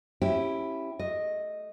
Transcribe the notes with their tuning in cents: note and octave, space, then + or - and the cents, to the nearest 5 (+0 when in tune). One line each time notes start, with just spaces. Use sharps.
C#4 -25 E4 +0 G4 +0
A3 -25 D#5 -5